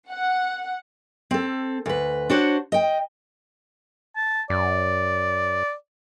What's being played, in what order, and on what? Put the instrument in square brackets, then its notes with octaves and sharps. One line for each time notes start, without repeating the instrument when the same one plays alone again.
[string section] F#5
[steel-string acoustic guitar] C4 A4
D2 B4
D4 F#4 C5 C#5
D#5 G5
[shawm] A5
[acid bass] F#2 [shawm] D5